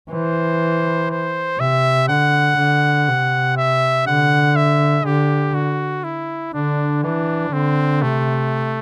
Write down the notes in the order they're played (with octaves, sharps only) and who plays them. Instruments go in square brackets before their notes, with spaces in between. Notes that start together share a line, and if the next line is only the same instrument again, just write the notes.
[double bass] E3 [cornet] C5
[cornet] C5
[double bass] C3 [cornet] E5
[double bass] D3 [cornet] F#5
[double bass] D3
C3
[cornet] E5
[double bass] D3 [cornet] F#5
[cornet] E5
[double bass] D3 [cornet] G4
[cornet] F#4
E4
[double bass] D3 [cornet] D4
[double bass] E3 [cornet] D4
[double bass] D3 [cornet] C4
[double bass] C3 [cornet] A3